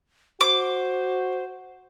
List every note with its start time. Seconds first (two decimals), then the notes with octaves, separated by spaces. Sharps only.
0.41 F#4 C5 D6